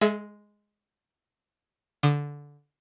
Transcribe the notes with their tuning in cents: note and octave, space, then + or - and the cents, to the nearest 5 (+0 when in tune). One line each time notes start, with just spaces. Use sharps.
G#3 +0 G#4 +45 E5 +0
D3 -15 D#6 -40